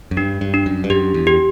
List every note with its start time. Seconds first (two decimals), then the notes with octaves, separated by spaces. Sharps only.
0.11 F#2
0.17 G2 D4
0.41 G2
0.54 D4
0.66 F#2
0.84 G2
0.90 F#2 G4
1.14 E2
1.27 G4